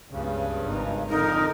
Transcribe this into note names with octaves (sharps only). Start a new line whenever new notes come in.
C#2 G2 C#3 B3
G#1 D#4
F2 D3 D#4 A#4